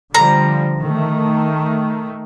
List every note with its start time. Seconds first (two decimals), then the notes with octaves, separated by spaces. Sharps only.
0.14 D3 F3 G3 A#5
0.79 D#3 A3